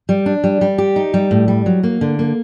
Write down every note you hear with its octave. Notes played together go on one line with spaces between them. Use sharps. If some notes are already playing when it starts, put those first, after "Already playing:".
G3
D4
G3
G3
G4
D#4
G3
A2
G3
F#3
A#3
D3
A#3